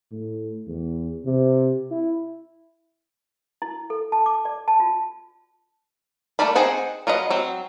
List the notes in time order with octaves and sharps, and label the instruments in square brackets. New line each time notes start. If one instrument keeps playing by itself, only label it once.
[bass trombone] A2
E2
C3
E4
[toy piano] E4
A4
A5
D6
D5
A5
F4
[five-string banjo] A3 A#3 A#4 D5 B5
C4 D#4 G#4 C5 F#5
F#3 F4 B4 D#5
F#3 C4